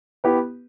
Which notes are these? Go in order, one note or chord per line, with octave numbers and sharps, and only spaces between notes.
B3 E4 G4 B4